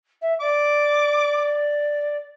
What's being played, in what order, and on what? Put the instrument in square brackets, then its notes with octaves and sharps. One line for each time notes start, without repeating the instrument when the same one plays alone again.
[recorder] E5
[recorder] D5 [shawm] D6